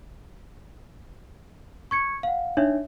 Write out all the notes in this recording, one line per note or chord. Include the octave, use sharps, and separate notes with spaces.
C#6 G#6 C#7
F5 F#5
D4 D#4 C#5 E5